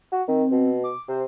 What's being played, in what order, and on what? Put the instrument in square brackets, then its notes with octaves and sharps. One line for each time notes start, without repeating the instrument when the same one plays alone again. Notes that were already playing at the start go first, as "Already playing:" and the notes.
[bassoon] F#4
[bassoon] D#3 [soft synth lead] C4
[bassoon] B2
[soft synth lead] D6
[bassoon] C3 [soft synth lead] C5